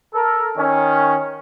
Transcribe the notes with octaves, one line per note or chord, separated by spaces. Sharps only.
A4 A#4
D#3 C#4